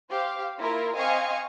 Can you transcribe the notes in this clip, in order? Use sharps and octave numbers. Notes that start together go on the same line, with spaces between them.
G4 C5 F5
A#3 E4 F4 A#4
C4 D#5 F5 G#5 C#6